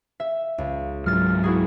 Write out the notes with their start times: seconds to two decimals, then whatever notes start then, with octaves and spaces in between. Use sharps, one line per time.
0.20 E5
0.58 C#2
1.06 G#2 F#3 F6 A6
1.43 E4 F#4 G#4